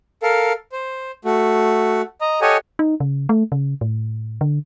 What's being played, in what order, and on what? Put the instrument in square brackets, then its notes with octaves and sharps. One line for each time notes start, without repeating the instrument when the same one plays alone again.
[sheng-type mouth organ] A4 A#4 F5
C5
A3 F#4
D#5 A#5
G4 A4 C#5 D#5 F#5 G#5
[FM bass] D#4
C#3
A3
C#3
A2
D3